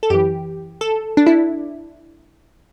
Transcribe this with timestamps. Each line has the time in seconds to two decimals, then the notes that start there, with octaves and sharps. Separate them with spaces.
0.03 A4
0.10 F#2 E3 G4
0.81 A4
1.17 D4
1.27 E4